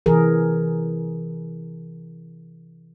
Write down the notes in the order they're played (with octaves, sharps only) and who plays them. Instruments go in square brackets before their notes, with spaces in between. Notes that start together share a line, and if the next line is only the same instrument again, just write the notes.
[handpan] C3 E3 G#4 A#4